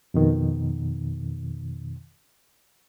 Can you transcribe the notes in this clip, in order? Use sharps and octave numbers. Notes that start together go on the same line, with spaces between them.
F2 B2 D#3